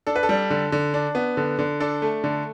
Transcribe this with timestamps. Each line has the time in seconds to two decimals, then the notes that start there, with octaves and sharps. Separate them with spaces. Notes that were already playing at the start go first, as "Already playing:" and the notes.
0.07 D4 A4
0.16 B4
0.23 A4
0.29 G3
0.50 D3
0.72 D3
0.94 D4
1.15 B3
1.37 D3
1.59 D3
1.80 D4 A4
2.02 A3
2.24 D3